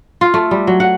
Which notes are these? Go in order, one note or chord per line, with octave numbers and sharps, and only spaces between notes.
F4
A3
G3
F#3
F#5